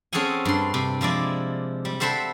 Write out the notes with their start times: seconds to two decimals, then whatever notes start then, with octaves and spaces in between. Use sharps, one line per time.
0.13 C4 C#4 G#4 A4 F#5 G#5
0.45 G2 C6
0.74 C3
1.01 F3 G#3 E4 D5
1.85 G3
2.00 C4 A4 C5 E5 F#5 B5